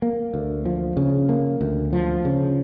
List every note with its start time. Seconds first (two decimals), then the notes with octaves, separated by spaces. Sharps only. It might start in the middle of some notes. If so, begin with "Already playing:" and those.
0.02 A#3
0.34 D2
0.65 F3
0.97 C#3
1.29 A#3
1.61 D2
1.93 F3
2.25 C#3